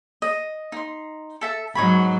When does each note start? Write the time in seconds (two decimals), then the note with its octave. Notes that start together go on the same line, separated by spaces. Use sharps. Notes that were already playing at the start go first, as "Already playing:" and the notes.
0.22 D#5
0.72 D#4 C6
1.41 A4 E5 A5
1.75 G#2 F#3 D#4 C#5 B5